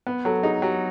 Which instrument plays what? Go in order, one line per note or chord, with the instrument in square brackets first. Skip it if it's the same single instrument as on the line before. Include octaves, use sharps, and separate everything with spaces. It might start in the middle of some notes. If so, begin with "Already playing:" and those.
[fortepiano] B3
[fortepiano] F#3 [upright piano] A4
[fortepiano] D#4 [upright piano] G#4
[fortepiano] F#3 [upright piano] G4